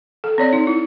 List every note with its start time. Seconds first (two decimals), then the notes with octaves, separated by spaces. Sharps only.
0.24 A4
0.38 C4 C#5 D5
0.53 D#4
0.67 E4